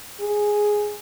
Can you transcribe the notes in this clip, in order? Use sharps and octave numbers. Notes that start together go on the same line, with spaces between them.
G#4